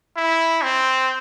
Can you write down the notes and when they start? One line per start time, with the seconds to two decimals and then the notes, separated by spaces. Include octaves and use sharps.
0.17 E4
0.63 C4